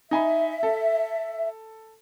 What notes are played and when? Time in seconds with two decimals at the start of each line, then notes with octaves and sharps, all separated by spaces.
0.11 D#4 E5 G#5 B5
0.63 A4